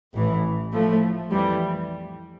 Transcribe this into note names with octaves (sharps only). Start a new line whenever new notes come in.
A1 A2 E3
A2 F3 A3
F2 E3 G3